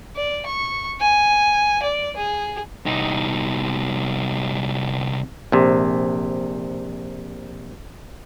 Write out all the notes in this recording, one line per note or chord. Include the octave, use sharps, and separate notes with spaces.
D5
C#6
G#5
D5
G#4
C2 D#4
A#1 C3